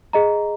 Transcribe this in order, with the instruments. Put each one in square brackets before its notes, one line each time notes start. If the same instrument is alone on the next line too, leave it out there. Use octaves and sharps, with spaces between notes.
[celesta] G#4 D#5 A#5